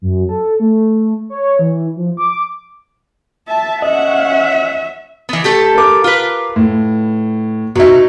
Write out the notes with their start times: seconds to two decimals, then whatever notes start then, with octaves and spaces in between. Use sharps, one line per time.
0.02 F#2
0.29 A4
0.60 A3
1.30 C#5
1.59 E3
1.96 F3
2.17 D6
3.48 E5 A5
3.82 C#4 D#5 E5 F#5
5.29 E3 B3
5.44 A3 G4 A4
5.75 A#4 D6
6.04 F4 B4
6.56 A2
7.75 B2 F#3 D#4 E5